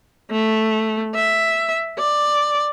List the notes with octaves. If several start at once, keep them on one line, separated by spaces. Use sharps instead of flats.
A3
E5
D5